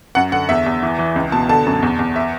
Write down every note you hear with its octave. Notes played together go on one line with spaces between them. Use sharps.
F#2 F#5
D3 F#5
E2 E5
E2
E3
E3
C#2
B2 A5
D3 A5
F#2
E2
E2
E5